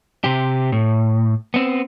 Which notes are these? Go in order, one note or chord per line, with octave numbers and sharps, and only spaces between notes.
C3 G4
A2
B3 C4